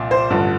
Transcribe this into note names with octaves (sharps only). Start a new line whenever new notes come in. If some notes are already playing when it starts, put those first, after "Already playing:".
Already playing: C2 A#2 F3
C5
A1 G2 D3 F3